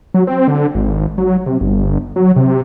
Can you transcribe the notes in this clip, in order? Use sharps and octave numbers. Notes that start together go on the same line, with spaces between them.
F#3
C4
D3
G#1
F#3
C3
G1
F#3
C3